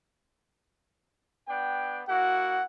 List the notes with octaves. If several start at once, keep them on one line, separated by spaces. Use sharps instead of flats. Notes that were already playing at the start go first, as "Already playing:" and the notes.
B3 D4 G5
A#3 E4 F#4 F#5